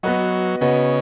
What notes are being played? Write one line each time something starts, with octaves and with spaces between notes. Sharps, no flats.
F#3 B3 F#4 B4 D#5
C#3 B3 F#4 B4 D#5